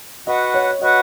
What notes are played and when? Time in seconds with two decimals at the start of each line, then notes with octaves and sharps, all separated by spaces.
0.27 F#4 B4 D#5 F#5
0.54 C#5
0.82 F#4 B4 D#5 F#5